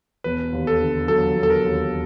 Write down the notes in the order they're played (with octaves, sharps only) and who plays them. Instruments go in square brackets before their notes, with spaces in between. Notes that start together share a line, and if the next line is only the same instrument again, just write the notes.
[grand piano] E1 [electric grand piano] B4
[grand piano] D#2
[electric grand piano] A4
[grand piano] D3
[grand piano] F#3 [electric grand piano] A4
[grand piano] E1
[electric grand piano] A4
A#4
[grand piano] D#2